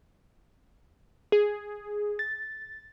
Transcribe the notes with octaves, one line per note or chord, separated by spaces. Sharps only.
G#4
A6